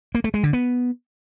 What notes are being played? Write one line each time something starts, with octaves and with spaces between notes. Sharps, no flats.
A#3
A3
G#3
D3
B3